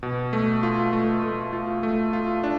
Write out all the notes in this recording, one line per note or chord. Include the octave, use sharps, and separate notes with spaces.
B2
A3
F4
A3
A3
F4
A3
F4
D4